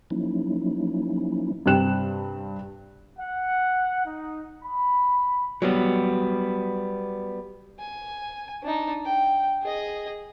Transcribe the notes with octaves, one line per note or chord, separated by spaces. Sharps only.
F3 F#3 A#3 C#4 D#4 E4
G2 C3 C4 F#6 E7
F#5
D#4
B5
F#3 G3 B3
G#5
D4 D#4
G5
G#4 D#5